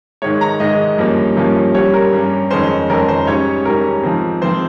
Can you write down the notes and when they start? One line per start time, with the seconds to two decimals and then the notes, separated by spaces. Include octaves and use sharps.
0.22 G#2 D#3 G#3 C#5
0.41 A#5
0.60 G#2 D#3 G#3 D#5
0.98 G2 F3 A#3 C#4
1.36 G2 F3 A#3 C#4
1.74 G2 G3 C#4 C#5
1.94 A#4
2.13 G2 G3 C#4
2.51 F2 D#3 G#3 C#4 C5
2.89 F2 D#3 G#3 C#4 A#4
3.08 C5
3.27 G#2 G3 C#4 C#5
3.65 G#2 G3 C#4 A#4
4.03 G#2 F3 C4
4.42 G#2 F3 C4 C5